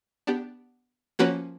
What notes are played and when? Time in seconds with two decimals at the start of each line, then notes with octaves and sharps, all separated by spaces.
0.27 B3 D4 G4
1.19 F3 A#3 C#4 F#4 B4